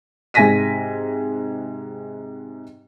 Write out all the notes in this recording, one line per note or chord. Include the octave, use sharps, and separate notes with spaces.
G#2 C3 G#5 A#6 B6 D#7